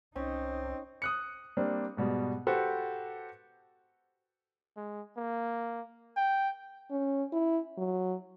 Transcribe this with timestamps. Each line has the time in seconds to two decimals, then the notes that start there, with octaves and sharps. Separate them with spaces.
0.16 C2 C4 C#4 D#4
1.02 D#6 F#6 C#7
1.57 G3 A#3 C4 D4
1.97 G#2 B2 G3
2.47 F#4 G4 A4 B4 C5
4.77 G#3
5.17 A#3
6.17 G5
6.91 C#4
7.33 E4
7.78 F#3